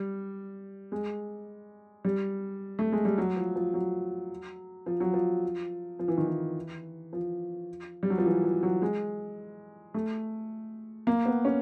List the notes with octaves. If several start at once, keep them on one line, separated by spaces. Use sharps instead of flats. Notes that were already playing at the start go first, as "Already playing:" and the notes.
Already playing: G3
G#3
G3
A3
G#3
G3
F#3
F3
F3
F#3
F3
F#3
F3
F3
E3
D#3
E3
F3
G3
F#3
F3
E3
F3
F#3
G#3
A3
A#3
B3
C#4